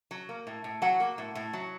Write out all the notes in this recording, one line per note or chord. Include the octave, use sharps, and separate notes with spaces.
F#3
A#3
A2
A2
F#3 F#5
A#3
A2
A2
F#3